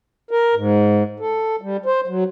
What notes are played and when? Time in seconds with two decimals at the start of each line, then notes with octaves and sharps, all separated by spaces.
0.31 A#4
0.55 G#2
1.20 A4
1.62 G3
1.86 C5
2.07 F#3